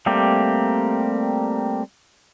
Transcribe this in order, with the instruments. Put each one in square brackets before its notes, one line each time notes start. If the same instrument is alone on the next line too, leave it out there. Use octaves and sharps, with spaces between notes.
[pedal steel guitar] G3 A3 A#3 C4 G4